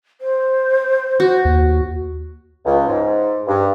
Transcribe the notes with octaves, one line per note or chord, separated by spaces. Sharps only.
C5
F#4
D#2
C#2
G#2
G2